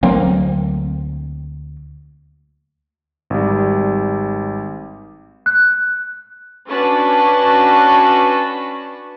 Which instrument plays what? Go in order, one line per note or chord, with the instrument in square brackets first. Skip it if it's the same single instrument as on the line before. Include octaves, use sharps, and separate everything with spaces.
[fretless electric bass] D2 F#3 A#3 C4
[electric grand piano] G#1 G3
[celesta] F#6
[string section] C#4 D4 F#4 B4 A5